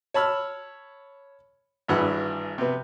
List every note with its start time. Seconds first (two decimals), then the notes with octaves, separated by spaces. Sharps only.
0.14 C#5 A5 B5 E6 F6
1.88 G#1 G2 E3 F#5
2.58 C3 B3